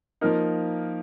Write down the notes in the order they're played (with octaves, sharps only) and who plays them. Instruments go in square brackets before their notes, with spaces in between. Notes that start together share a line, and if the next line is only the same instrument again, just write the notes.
[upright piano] F3 A#3 D#4 A#4